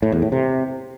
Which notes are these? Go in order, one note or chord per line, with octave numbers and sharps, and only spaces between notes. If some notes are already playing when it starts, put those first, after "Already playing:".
A2
E2
A2
C3